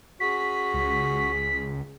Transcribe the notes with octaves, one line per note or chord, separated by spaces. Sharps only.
C#4 F#4 G#4 B6
C#2